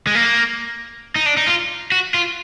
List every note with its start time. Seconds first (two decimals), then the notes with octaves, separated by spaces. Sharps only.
0.07 G#3
0.15 A#3
1.16 D#4
1.26 D4
1.37 D#4
1.47 F4
1.92 F#4
2.14 F4